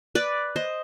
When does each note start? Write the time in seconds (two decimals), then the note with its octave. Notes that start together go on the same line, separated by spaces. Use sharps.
0.15 B4 D5
0.56 C5 D#5